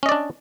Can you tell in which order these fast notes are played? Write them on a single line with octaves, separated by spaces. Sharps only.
C#4 D#5 D5 D4